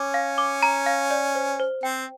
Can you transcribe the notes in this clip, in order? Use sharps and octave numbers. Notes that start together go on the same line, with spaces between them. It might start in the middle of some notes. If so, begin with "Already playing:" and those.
Already playing: C#4 D6
F5
D6
A#5
F5
D5
C5
C5
C4 G5